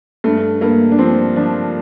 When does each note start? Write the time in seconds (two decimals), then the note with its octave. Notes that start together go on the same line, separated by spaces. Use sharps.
0.24 G2 A3
0.61 G2 A#3
0.92 D4
0.98 F3 C4
1.36 F3 D4